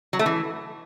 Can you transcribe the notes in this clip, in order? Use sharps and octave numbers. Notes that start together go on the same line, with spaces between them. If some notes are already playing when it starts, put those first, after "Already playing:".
F#3
A3
E3